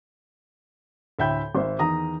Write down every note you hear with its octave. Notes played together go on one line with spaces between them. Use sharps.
D2 A2 E5 G5 B5 G6
G#1 C5 E5
E2 D#3 A#5 D#6